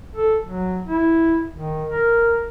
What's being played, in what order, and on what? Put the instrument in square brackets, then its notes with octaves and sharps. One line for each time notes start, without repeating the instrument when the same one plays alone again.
[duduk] A4
F#3
E4
D#3
A#4